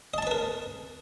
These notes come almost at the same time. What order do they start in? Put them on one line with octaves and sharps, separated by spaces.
D#5 A5 A#5 B4 A#4